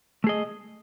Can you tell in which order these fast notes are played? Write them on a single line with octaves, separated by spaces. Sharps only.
A3 G#4 D#5